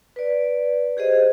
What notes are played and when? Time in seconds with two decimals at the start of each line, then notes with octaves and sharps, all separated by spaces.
0.16 B4 D5
0.97 G4 G#4 C5 D#5